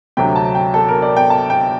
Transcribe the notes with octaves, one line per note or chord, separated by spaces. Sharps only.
D2 C3 F#3 G5
A5
G5
A4
A#4
D5
G5
A5
G5